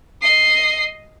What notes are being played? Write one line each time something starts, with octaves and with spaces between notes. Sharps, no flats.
D#5 C7